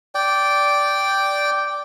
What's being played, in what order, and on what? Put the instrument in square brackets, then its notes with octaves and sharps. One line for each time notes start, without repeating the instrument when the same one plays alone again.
[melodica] D5 G5